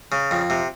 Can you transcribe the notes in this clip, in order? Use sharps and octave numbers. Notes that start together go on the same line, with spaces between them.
C#3
F2
C3